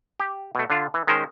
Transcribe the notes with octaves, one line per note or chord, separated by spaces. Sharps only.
G4
B2 A3
D3 D4 F4
E3
D#3 G#3 C#4 A#4 C5